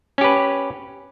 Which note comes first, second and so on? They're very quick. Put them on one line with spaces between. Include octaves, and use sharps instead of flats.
C#4 G4 B4